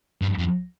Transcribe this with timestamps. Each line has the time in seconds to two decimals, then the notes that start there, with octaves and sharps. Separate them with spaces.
0.22 G2
0.38 F2